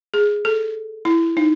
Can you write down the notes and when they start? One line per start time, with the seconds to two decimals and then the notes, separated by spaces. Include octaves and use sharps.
0.14 G#4
0.45 A4
1.05 E4
1.37 D#4